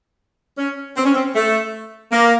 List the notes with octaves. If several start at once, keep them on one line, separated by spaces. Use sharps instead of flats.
C#4
C4
C#4
C4
A3
A#3